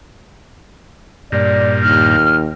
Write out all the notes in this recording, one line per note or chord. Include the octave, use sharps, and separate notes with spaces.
G2 A#2 D5
D#2 F6